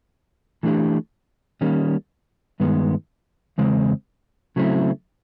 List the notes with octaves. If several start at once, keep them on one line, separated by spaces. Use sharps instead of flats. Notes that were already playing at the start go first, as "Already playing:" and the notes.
E3 A3 D4 G4
D#3 G3 A#3 C#4
G2 D#3 G#3 B3
E2 C#3 G#3 C4
C#3 F#3 A3 C4 E4